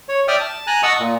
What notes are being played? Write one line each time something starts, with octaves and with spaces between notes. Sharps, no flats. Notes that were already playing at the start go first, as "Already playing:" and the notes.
C#5
D5 E5 G5 D#6 F6
A5
G#5 A#5 F#6
D#5 F#5 A5 C#6 D#6 E6
A#2